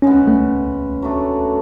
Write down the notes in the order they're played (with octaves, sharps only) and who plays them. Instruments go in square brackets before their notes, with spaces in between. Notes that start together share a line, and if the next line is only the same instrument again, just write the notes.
[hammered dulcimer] C#3 G#3 B3 [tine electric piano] C#4
[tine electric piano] A3
[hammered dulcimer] F#3 A3 D4 A4